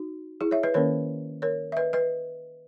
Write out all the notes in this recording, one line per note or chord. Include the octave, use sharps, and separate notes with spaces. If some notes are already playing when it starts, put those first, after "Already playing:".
Already playing: D#4 F#4
E4 G#4
C#5 E5
B4 D#5
D#3 A#3 C#4 A#4 C#5
A#4 C#5
E5
B4 D#5
B4 D#5